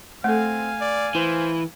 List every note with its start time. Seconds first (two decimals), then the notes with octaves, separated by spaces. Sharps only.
0.24 A3 C4 A4 F5 G#5
0.80 D5
1.15 E3 C5